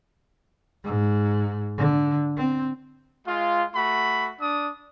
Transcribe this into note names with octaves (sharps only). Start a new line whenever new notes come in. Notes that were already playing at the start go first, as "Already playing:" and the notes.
G#2
D3
C4
G#3 F4
A3 F#4 B5
D4 D#6